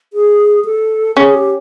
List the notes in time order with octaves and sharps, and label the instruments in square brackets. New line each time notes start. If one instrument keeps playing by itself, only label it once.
[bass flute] G#4
A4
[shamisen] C#4 [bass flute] G#4
[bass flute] G4